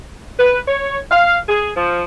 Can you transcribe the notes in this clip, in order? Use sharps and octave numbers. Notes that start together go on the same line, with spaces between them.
B4
C#5
F5
G#4
F3